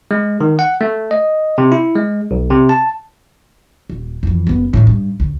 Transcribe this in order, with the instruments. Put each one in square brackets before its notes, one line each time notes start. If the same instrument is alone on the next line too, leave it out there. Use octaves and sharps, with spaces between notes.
[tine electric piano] G#3
D#3
F#5
A3
D#5
C3
E4
G#3
B1
C3
A5
[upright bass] D#1
F2 E3
F#1 B3
A2 D#3
G2
D2